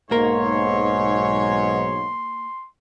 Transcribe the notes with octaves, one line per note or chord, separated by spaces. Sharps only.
B1 G#2 A#3 A#4 C#5 C6